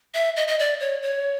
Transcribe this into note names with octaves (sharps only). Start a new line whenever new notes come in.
E5
D#5
D#5
D5
C#5
C#5